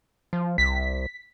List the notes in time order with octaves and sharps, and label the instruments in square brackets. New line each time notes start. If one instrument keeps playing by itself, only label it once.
[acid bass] F3
[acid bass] C2 [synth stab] B6